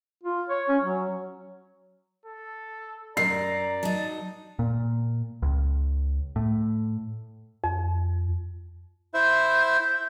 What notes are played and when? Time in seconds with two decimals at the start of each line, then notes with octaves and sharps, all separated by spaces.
0.23 F4
0.49 C#5
0.68 C#4
0.83 F#3
2.25 A4
3.17 F#2 D5 A#5 C7
3.83 F#3 D#4 A5
4.59 A#2
5.42 C#2
6.36 A2
7.64 F2
9.14 E4 C5 E5 G6